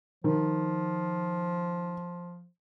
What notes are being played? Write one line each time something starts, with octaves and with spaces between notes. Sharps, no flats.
D#3 F3